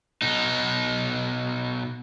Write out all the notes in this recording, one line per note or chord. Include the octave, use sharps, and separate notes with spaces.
B2 D#4